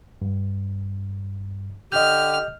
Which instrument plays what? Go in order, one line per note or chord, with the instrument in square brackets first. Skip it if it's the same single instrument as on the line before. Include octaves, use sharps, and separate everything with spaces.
[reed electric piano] G2
[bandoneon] D3 G4 [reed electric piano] D#5 G6 [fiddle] F6